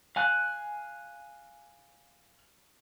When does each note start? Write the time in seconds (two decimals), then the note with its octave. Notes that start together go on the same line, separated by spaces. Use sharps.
0.16 F5 G#5 F#6